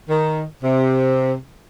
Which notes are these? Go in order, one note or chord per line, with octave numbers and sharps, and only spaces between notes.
D#3
C3